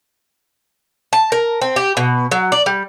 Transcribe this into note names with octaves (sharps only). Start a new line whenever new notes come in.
A5
A#4
C4
G4
B2
F#3
D5
G3